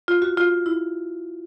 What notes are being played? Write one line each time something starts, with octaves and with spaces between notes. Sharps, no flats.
F4
F#4
F4
E4